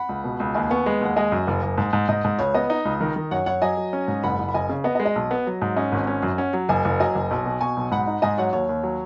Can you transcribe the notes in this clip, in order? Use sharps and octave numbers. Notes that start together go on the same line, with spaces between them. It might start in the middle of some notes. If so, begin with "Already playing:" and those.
Already playing: F#5 B5
C#2
B2
C#2
D#2 D#5 G#5
B3 G#5 C#6
G#3 F#5 B5
D#2 F#5
G#3 D#5 G#5
F#2
F#1
F#1
G#2
G#2
G#2 D#5
G#2
C#2 C#5
B3 D#5
D#4
C#2
D#3
D#3
F#2 C#5 F#5
F#2 C#5 F#5
F#3 D#5 G#5
F#3
C#4
G#2
F#1 F#5 B5
F#1
B5
F#1 D#5 G#5
C#3
B3 D#5
D#5
G#3
D#5
B1
B3
F#3
G#2
C#4 D#5
G#1
C#4
F#2
C#4 C#5 F#5
F#3
F#1 D#5 G#5
F#1
F#3 D#5 G#5
F#1
B1
B2
B2 G#5 C#6
B1
G#2 F#5 B5
D#4
G#2 D#5 G#5
F#3 C#5 F#5
D#2 C#5
D#2
F#3